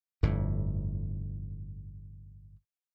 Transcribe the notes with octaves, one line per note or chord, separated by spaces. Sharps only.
G1 F2 A2